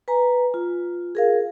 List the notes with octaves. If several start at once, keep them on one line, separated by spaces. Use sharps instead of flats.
B4 G#5 A#5
F4
G#4 A#4 F5